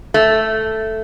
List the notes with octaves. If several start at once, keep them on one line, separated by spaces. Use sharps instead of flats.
A3